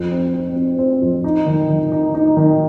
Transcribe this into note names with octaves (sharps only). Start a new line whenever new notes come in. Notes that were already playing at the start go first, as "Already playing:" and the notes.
Already playing: F2
C4
C4
C4
C4
F2
D#4
D#3
D#3
D#4
D#4
D#3